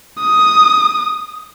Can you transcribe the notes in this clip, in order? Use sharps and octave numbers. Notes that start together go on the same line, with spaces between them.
D#6